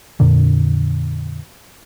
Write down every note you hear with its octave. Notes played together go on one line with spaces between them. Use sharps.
F2 A#2 D3